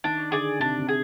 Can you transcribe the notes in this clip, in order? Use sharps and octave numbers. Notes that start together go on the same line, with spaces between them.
D#3 D4
D3 G#4 D5
C3 D4
C3
G#4